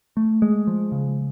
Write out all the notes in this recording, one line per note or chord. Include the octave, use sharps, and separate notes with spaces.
A3
G#3
F3
C#3